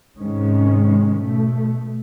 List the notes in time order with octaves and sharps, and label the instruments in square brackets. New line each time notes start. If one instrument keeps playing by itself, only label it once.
[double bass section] G#2 C3 D#3 G#3 C#4
B2 A3